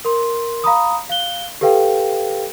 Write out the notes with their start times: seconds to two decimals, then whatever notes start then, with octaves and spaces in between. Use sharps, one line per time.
0.05 A#4 C6
0.64 F5 A#5 B5 D#6
1.09 F5 F#6 G7
1.61 G4 A4 B4 F5 G5